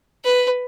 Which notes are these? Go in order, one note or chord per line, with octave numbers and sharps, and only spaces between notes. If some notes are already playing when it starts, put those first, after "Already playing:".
B4